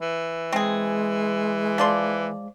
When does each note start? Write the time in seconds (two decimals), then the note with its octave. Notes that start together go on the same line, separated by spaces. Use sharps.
0.01 E3
0.53 G#3 C4 G#4
1.78 F3 D5 C6